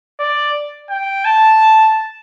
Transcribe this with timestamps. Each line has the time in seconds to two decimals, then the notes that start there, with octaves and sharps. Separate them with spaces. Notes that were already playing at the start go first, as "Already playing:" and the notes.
0.20 D5
0.90 G5
1.25 A5